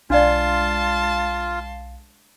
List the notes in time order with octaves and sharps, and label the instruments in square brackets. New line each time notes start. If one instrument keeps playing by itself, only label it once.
[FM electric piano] B1 F5 [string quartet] G#3 A5 C6 [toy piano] D4 D5 [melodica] F4